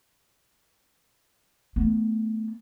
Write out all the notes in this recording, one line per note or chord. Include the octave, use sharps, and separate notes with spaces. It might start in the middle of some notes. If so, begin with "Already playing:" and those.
A3 B3